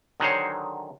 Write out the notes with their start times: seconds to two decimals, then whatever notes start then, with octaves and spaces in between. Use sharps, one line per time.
0.20 D3 D#3 F#3 G#4 C5 C#5